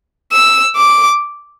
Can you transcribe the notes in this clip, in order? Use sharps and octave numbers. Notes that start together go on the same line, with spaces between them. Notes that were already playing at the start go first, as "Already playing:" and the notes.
E6
D6